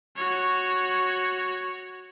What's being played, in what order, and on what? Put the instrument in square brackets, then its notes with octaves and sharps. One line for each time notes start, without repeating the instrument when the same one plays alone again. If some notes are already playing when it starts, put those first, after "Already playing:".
[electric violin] F#4 C#5